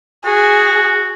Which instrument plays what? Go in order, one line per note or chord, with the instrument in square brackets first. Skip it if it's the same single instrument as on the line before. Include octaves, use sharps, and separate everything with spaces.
[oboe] F#4 [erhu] G#4